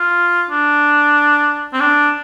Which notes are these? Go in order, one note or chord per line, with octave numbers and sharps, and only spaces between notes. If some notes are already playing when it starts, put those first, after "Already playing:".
Already playing: F4
D4
C4
D4